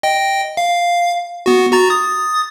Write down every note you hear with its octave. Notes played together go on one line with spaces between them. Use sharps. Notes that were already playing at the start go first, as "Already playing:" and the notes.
D#5 G5
F5
B3 F#4
F#4 A#5 A6
D#6 A6